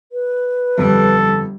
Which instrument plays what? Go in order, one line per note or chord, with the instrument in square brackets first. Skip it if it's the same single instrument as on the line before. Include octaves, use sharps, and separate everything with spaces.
[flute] B4
[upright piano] G1 F2 [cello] G3 [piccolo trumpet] A4